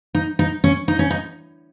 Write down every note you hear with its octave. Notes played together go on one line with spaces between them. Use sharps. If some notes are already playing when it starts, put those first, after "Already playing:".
D#4
D#4
C#4
D#4
C#4
D#4